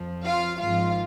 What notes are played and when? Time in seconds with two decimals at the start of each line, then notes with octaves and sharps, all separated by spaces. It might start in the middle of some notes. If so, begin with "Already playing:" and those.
Already playing: F2 F3
0.24 F4 F5
0.60 G#1 G#2 F3 F4 F5